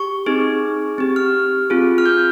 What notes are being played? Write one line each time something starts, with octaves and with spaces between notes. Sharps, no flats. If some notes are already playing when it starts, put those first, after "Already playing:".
Already playing: G4 C#6
C4 D#4 G#4
C4 G4
F6
C4 F4 G#4
F6
G6